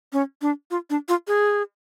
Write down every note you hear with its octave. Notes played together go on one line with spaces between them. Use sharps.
C#4
D4
F4
D4
F4
G#4